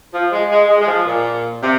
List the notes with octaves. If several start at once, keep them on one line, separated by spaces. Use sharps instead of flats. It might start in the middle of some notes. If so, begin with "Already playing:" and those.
F3
G#3
G#3
G#3
G#3
F3
A#2
C3